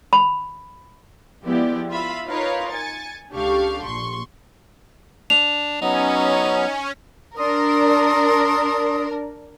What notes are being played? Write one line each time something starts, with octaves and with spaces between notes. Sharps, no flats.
B5
F3 G#3 B3 E4 G4 D5
F4 E5 F5 B5 E6
D#4 F4 A#4 B4 C#5 F5
G#5 A6 C#7
C#2 D4 G4 A4 F5 C#6
A#1 C6 C#6
D4 F7
F#3 B3 C#4 D#4
D4 A#4 D5 C6 D#6